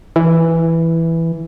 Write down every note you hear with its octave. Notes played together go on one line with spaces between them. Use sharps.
E3